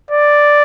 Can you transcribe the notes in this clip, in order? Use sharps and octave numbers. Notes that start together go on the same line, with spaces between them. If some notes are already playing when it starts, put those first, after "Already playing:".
D5